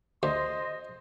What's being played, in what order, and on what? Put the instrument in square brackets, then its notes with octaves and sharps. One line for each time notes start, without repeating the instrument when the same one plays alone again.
[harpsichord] D2 [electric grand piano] C5 [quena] D#5 [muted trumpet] C6